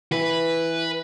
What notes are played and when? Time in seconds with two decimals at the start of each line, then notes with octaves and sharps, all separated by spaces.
0.12 E3 B4